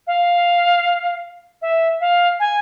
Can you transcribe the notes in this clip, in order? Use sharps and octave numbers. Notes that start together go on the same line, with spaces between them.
F5
E5
F5
G#5